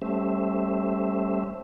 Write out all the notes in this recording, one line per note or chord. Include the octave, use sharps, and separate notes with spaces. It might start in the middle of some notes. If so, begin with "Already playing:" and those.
G3 A3 C#4 C5 E5